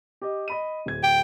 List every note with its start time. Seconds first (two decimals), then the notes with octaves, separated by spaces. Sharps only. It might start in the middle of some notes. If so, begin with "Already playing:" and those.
0.22 G4 D#5
0.48 D#5 B5 D#7
0.86 D1 G#6
1.03 G5